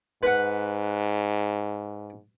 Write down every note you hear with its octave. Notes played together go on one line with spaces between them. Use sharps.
G#2 B4 F#5